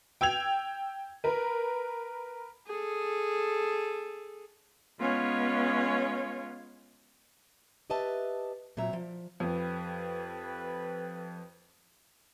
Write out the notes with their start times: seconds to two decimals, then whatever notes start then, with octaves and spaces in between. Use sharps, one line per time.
0.21 G5 E6 G#6 F7
1.24 A#4 B4
2.66 G#4 A4
4.99 G#3 B3 C#4 F4 C#5
7.90 G4 B4 D#5 E5 A5
8.77 A#2 F#3 C4 E5 A#5
8.93 F3
9.40 F2 G4 A4 B4